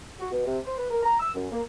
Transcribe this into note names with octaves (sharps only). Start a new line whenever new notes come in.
F#4
B2
C3
C5
B4
A#4
A#5
E6
F#2
A#3